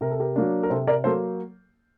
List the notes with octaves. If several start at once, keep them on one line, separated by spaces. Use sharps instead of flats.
C3 A#4
A4
G4 A#4
F#3 A#3 D4
A#4
C3 A4 C5
A#4 D5
F#3 A#3 A4 C5